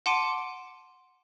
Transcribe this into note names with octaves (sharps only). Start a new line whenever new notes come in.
F#5 A5 C6 D6 D7 D#7